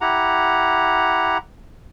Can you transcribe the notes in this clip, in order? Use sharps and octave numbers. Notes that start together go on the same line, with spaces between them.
E4 G4 F#5 A#5